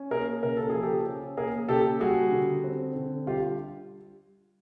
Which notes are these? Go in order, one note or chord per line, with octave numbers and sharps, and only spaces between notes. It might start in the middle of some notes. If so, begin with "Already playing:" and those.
Already playing: C#4
A#3 G#4 A#4
C#3 A#4
A4
G#4
F3
G4 A4
C#4
A#3 G#4 A#4
C#3 G4 A4
G3 F#4 G#4
D3
C4
D3
G3 F4 G4